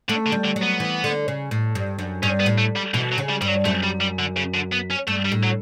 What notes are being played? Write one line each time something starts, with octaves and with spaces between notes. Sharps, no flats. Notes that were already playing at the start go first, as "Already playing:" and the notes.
D3 A3
D3
G3
D3
F#3
B3
E3
D3
C#3
A2
G2
F#2
G2 C#4
B3
A2
A3
G3
B2 E3
F#3
C#3
G3
G2 G3
F#3
F#2 A3
G3
G3
D3
C#3
D3
B3
C#4
G2 A3
G3
A2
F#3